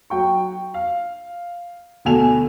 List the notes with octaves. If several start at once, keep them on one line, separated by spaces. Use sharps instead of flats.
F#3 G5 C#6
F5
D2 B2 A4 G#5 F7